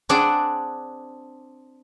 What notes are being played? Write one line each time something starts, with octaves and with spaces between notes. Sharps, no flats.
C4 D4 G#4 D5 F#5